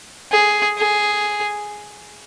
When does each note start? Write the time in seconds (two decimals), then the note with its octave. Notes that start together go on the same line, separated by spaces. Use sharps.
0.32 G#4
0.78 G#4